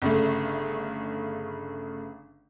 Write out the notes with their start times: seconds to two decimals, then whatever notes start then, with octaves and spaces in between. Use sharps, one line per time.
0.02 G1 C#3 A3